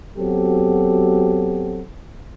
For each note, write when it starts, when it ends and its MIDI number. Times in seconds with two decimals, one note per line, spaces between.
0.18 1.82 54
0.18 1.82 59
0.18 1.82 60
0.18 1.82 66
0.18 1.82 67
0.18 1.82 69